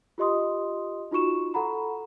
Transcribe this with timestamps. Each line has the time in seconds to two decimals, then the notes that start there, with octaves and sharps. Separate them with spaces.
0.18 F4 G4 D#5 C6 D#6
1.11 D#4 F4 F#4 C#6 E7
1.54 A4 F#5 A#5 B5